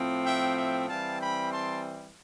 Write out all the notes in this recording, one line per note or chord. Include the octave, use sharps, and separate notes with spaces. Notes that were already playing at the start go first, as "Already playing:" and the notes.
Already playing: A2 F3 C4
E5 G5
E5 G5
E3 G3 C4 F5 A5
G5 B5
A5 C6